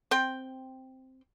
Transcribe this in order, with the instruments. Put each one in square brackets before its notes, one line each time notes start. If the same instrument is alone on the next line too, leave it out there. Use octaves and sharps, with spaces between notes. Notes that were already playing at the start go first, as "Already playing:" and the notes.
[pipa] C4 G5